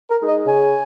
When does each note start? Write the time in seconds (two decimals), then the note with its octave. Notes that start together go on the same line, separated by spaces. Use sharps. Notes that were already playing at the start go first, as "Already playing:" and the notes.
0.10 A#4
0.20 G#3 D#4
0.28 D#5
0.46 C#3 G#5